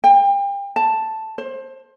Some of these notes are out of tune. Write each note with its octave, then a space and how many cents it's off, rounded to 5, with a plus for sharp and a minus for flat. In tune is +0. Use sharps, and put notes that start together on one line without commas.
G5 +30
A5 +0
C5 +25